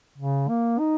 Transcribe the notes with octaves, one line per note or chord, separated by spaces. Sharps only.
C#3
A#3
D#4